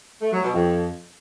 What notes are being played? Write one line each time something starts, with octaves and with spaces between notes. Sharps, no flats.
A3
F#3
B2
F2